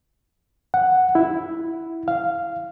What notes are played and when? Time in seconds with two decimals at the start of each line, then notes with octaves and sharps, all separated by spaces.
0.74 F#5
1.15 E4
2.08 F5